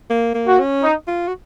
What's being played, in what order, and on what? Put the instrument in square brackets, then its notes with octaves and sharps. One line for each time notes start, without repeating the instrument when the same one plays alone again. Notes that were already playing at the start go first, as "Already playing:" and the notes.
[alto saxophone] A#3
A#3
[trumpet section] F#4
[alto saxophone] C#4
[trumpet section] D#4
[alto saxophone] F4
F#4